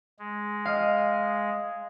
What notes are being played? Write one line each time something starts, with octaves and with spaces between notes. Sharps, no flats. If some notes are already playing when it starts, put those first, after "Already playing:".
G#3
D#5 F5